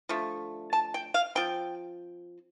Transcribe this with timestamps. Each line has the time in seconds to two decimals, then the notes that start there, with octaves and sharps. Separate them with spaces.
0.09 D3 F3 A3
0.73 A5
0.94 G5
1.14 F5
1.35 F3 C4 G5